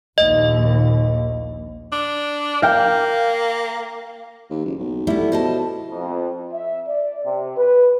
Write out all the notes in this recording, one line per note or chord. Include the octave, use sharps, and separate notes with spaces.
A#1 D#2 D#5
D4
A#3 F5 G5
D#2
F#1
B1
G3 A3 B3 E4
B2 C5 D#5 A5
F2
E5
D5
C3
B4